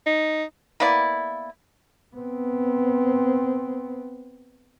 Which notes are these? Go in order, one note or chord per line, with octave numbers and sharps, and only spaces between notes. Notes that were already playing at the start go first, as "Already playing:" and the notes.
D#4
A#3 B3 E4 D5
B3 C4